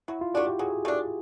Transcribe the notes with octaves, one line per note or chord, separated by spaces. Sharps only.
F#3 E4
F4
A3 D4 F#4
G4
F#3 G#4
A3 D4